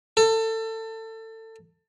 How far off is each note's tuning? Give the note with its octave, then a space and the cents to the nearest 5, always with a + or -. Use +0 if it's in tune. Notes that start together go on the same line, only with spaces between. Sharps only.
A4 +25